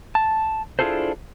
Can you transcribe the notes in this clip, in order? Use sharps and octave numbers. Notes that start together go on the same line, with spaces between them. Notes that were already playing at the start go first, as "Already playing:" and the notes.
A5
D4 E4 F4 G#4 A4 C5